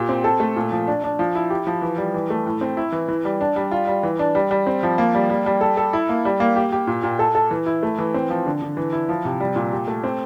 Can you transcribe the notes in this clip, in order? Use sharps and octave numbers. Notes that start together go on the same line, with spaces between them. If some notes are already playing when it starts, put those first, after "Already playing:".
Already playing: A#2 G4
C4
A4
A3
A#2
F3
D4
D4
F3
E4
G4
F3
E3
G3
E3
A3
A2
C4
E4
E3
E3
G3
D4
G3
F4
G3
E3
D4
G3
G3
C4
F3
A#3
G3
G3
G3
A4
A4
E4
A#3
G3
A#3
G4
G4
A#2
A#2
A4
A4
E3
E4
A3
E3
C4
F3
D3
D3
E3
E4
F3
C3
G3
A#2
G4
A3
C4